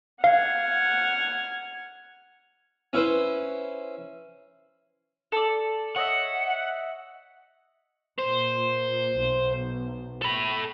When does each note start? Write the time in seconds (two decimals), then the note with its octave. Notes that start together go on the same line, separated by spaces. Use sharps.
0.24 F5 F#5 F6 G#6
2.93 C#4 E4 B4 C5
5.32 A4 D5
5.96 C#5 D#5 E5 F#5
8.19 A#2 C5
9.17 B1
10.22 A4 B5